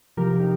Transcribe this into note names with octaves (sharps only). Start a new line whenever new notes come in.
C3 F3 G4 A#4
D#4 G4